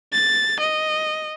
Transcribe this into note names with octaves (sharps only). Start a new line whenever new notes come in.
A6
D#5